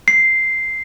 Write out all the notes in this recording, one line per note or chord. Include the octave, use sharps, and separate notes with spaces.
C7